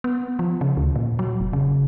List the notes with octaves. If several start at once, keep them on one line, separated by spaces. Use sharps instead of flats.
B3
F3
C#3
D2
A#2
F#3
F1
C#3